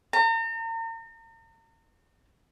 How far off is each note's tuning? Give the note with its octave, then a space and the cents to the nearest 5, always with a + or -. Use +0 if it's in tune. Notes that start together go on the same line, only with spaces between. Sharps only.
A#5 -40